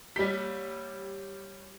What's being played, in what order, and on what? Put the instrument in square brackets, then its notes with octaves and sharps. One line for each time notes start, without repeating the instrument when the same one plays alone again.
[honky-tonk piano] G3 B6 [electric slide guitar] G4 C#5